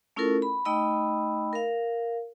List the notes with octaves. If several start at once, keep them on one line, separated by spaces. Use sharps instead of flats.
A3 C#4 E4 F4 A4 A#4
B5
A3 D#4 D#5 G5 B5 E6
A#4 F5